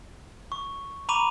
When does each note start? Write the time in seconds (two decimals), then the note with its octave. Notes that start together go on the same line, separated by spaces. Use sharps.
0.52 C#6
1.09 A#5 B5 C#6 D6 D#7 F7